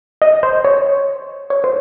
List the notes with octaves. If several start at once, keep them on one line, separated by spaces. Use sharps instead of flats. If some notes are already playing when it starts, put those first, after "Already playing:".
D#5
C5
C#5
C#5
C5